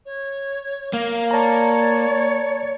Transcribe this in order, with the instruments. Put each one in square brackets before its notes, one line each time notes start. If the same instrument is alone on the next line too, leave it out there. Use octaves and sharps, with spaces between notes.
[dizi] C#5
[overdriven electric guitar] A#3 [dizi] F5
[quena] C#5 [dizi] D5 [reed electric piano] A5 A#5